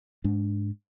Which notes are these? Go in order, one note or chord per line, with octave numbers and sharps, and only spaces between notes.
G#2 G#3 D4